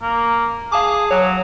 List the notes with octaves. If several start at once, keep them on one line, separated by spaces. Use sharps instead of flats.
A#3
G#4 F5 A5 D6
F#3 C#5